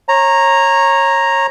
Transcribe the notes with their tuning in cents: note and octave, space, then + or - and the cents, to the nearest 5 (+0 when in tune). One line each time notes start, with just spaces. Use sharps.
C#5 -25 A#5 +0